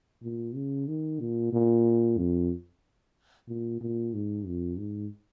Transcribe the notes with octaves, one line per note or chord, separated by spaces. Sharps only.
A#2
C#3
D#3
A#2
A#2
F2
A#2
A#2
G#2
F2
G#2